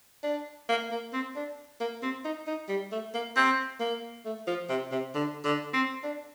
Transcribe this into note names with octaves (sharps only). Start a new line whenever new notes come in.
D4
A#3
A#3
C4
D4
A#3
C4
D#4
D#4
G3
A3
A#3
C4
A#3
A3
F3
C3
C3
D3
D3
C4
D4